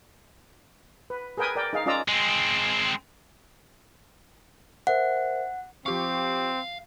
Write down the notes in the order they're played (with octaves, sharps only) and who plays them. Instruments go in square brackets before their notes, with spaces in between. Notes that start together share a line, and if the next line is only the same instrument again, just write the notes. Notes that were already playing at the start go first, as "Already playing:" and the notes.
[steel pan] B4
G#4 A#4 B4 G5 G#5 D#6
A#4 D5 G5
D#4 G#4 F5
C#4 F4 D5 D#5 A#5 E6
[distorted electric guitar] G#3 C4
[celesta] A#4 C5 E5 [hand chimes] F#5
[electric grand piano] F3 G4 C#6 [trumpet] C4 [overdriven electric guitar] F5